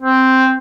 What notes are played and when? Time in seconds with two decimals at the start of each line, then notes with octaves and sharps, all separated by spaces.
0.01 C4